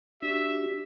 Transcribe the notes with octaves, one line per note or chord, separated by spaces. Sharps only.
D4 F#4 G4 E5